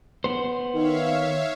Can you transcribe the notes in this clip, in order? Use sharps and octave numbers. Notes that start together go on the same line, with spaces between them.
B3 C5
D#3 C#5 E5 F5